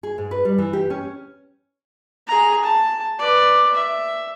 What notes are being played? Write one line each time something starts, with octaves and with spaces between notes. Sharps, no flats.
G#4
G#2
B4
G3
E3
G4
C#4
G#4 A#5
A5
B4 D5
E5